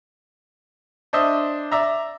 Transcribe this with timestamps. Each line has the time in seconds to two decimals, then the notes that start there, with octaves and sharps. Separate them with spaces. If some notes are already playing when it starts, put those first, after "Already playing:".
1.13 D4 C5 D#5 E5
1.72 D5 E5 A#5